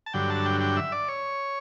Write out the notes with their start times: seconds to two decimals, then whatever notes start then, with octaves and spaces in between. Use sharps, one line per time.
0.06 A5
0.14 G2 D3 F#3 G5
0.30 A5
0.46 G5
0.61 G5
0.76 E5
0.92 D5
1.08 C#5